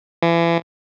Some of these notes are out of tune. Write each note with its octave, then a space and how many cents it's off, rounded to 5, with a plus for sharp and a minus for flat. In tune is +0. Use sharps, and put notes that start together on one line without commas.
E3 +35